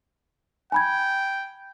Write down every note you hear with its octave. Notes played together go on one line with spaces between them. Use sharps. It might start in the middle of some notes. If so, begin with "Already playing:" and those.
G5 G#5 B5 G#6